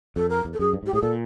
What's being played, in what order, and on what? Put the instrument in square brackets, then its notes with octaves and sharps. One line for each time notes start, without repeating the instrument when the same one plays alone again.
[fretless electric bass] F2 [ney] A4
[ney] A#4
[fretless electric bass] E2
[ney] A4
[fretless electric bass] F#2 [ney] G#4
[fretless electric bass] G2
[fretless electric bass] G#2 [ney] G4
[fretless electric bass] A2 [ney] G#4
[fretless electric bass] A#2 [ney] A4